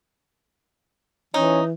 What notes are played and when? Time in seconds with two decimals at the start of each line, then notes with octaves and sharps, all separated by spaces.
1.34 E3 C#4 D#4